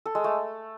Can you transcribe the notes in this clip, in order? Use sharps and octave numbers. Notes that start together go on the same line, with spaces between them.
A4
G#3
A3